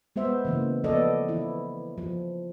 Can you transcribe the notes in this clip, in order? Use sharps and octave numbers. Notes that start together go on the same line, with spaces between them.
G#3 B3 C5 E5
C#3 E3 A#3
F3 B3 A4 D5 D#5
E3 E4
F3